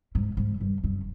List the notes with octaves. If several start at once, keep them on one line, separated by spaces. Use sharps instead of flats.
G#2
G#2
G2
F#2